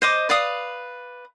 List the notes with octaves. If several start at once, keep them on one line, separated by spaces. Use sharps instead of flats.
C5 D#5 D6
B4 D5 F5 D#6